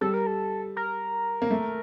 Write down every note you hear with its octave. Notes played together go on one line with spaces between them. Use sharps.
G3 A4
A#4
A4
A#4
A#3
A3